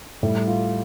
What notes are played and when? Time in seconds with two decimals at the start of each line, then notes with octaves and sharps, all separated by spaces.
0.23 A2 G3
0.47 F4